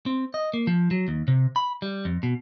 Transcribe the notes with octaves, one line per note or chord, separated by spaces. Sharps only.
C4
D#5
A#3
F3
F#3
D#2
C3
B5
G3
F2
B2